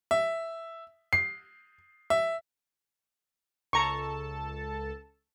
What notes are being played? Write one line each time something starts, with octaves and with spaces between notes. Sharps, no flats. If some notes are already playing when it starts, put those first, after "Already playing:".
E5
C7
E5
C#2 A4 A5 A#5 C#6